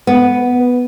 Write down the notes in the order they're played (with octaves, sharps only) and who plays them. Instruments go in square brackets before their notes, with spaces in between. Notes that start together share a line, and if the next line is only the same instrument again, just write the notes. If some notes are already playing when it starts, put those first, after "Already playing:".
[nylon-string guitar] B3